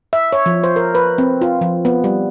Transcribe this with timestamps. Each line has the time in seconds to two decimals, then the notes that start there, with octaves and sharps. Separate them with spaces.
0.13 E5
0.33 C#5
0.46 F3
0.64 C5
0.76 A#4
0.95 B4
1.18 C4
1.41 F4
1.61 F3
1.85 B3
2.04 G3